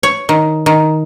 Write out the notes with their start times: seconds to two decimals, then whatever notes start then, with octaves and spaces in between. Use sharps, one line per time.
0.03 C#5
0.29 D#3
0.66 D#3